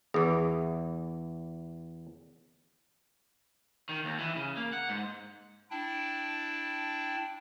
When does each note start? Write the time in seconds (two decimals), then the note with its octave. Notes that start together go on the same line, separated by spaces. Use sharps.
0.14 E2 E3 G#4
3.89 D#3
4.05 D#2
4.19 E3
4.36 C#3
4.57 A#3
4.73 F#5
4.89 G#2
5.71 D4 E4 G5 A5